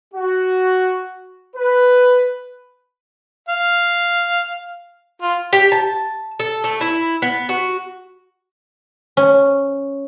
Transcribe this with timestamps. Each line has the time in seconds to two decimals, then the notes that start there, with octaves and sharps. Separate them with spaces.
0.14 F#4
1.56 B4
3.49 F5
5.22 F4
5.53 G4
5.72 A5
6.40 A4
6.64 A3
6.81 E4
7.22 B3
7.49 F#4
9.17 C#4